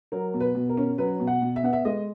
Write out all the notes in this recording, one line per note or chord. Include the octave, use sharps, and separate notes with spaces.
F#3 A#4
B2
B4
B2
A#4
C#4
F#3 B4
B2
F#5
B2
E5
B3 F#5
E5
G#3 D#5